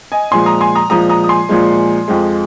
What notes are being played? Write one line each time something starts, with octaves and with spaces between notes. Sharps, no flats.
D#5 G#5
A#2 F3 G#3 G#5 C6
A#5 D#6
G#5 C6
A#5 D#6
A#2 F3 G#3 A#5 D#6
A#5 D#6
D#6
G#5 C6
A#2 F3 G#3
F2 F3 G#3